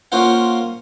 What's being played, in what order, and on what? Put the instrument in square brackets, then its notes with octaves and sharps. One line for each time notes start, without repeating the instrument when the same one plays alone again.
[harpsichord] A#3 C#4 F4 C5 F#5